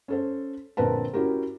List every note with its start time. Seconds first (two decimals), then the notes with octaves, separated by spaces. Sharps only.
0.08 C#4 A4 C5
0.77 A#1 D3 C4 A#4 B4 A5
1.13 C#4 E4 F#4 G4 A#4